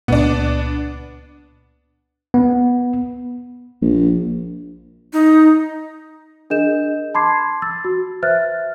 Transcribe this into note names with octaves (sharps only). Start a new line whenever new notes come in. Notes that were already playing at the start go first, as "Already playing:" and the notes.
C#2 A#2 B3 D4
B3
A#1
D#4
D4 G#4 A#4 D#5 G6 E7
A5 B5 C6 D6 G#6 C7
E6 A6
F#4
B4 C5 E5 F6 F#6 A6